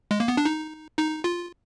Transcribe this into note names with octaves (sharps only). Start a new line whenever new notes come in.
G#3
A#3
B3
D4
D#4
D#4
F4